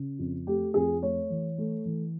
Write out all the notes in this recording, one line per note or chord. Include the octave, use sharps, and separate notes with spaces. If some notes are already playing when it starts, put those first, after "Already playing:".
Already playing: C#3
F2
A3 G4
F2 G#4
A3 C#5
E3
A3
E3